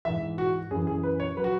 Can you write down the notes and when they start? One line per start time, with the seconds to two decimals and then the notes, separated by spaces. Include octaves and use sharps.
0.05 G#2 E3 E5
0.38 F#4
0.71 F#2 G#4
0.74 E3
0.87 G#4
1.03 B4
1.20 C#5
1.36 F#3 B4
1.44 F#4